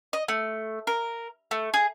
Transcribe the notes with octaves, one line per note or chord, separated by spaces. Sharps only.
D#5
A3
A#4
A3
G#4